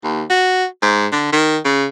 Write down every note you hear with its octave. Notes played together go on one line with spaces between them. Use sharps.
D#2
F#4
G#2
D3
D#3
C#3